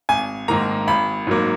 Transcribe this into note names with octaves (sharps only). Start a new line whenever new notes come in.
G#1 G#5
G#2 D#3 A#3 A#5
G#1 B5
G#2 F#3 A#3